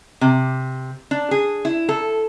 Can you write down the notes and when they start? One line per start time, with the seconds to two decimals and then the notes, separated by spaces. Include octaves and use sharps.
0.21 C3
1.11 D4
1.31 G#4
1.65 E4
1.89 A4